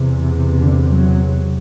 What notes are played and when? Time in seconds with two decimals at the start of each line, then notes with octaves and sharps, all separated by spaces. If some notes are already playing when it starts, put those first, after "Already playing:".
Already playing: E2 C3
0.61 D3
0.90 F#3